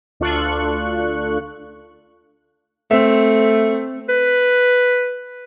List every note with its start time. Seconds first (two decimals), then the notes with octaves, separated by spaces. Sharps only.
0.20 D2 D4 F4 A4 C#6 F#6
2.91 A3 C4 E5
4.09 B4